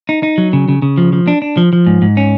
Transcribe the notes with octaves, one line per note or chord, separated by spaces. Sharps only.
D#4
D#4
F#3
C#3
C#3
C#3
F3
F3
D4
D4
F3
F3
G#2
G#2
C#4